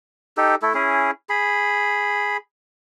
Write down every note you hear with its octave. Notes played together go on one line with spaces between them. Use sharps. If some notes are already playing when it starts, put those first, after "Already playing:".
D#4 G4 A4
A3 E4 A4
C#4 E4 G#4
G#4 B5